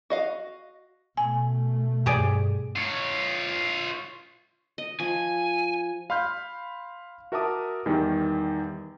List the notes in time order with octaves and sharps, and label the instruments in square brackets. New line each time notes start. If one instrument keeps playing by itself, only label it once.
[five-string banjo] F#4 D#5 F5
[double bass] B2 A3 [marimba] G#5
[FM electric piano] G2 [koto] G4 G#4 D5
[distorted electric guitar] F4 C#5
[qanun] D#5
[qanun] F3 [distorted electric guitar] G#5
[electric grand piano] F5 B5 C6 F6 G6
F#4 A#4 E5 A5 D6 D#6
E2 D#3 G3 G5